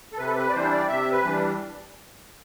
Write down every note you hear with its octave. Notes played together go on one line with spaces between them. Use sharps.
A4
C3 B4
A4
B4
D5
E3 G3 D4 C5
D5
C3 E5
B4
E3 G3 D4